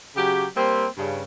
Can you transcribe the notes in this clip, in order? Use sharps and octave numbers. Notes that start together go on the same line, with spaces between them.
C#3 F#3 G4
G3 A#3 C4
G2 C#3